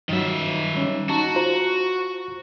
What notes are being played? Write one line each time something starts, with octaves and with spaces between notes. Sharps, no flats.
G2 D#3 F#3 E5
G3 C#4
D#4 F#4 A5 A#5
F4 C5 A#5